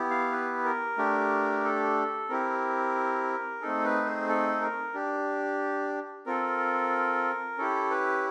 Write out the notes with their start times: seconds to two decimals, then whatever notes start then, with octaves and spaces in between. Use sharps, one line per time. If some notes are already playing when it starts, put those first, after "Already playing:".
Already playing: B3 E4 G4
0.10 F5
0.32 B4
0.64 A#4
0.98 A3 D4 G4
1.64 A4
2.29 C4 E4 G4 A#4
3.61 A3 C4 D#4 G#4 A4
3.84 B4
4.05 C5
4.28 A4
4.61 A#4
4.94 D4 G4
6.26 C4 F4 A4 A#4
7.58 C#4 E4 G4 A4
7.90 B4